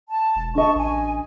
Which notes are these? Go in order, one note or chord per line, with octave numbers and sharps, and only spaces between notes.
A5
E1
D3 D#5 A5 C#6
A1 G#5